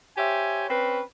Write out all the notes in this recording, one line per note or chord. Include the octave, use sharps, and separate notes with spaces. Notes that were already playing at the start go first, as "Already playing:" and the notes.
G4 C5 C#5 E5 G#5
C4 C#4 B4